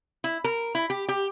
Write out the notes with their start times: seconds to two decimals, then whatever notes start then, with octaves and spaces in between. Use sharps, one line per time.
0.24 E4
0.44 A#4
0.75 E4
0.90 G4
1.09 G4